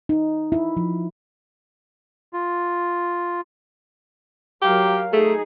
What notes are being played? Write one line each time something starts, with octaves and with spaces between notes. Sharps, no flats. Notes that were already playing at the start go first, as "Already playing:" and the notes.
D#4
E4
F3
F4
F#3 G4 A#4 F5
A3 D#4 G#4